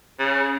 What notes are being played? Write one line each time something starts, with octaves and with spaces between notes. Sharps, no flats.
C#3